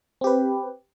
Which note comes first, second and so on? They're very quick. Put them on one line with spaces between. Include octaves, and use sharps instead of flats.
C4 G4 B4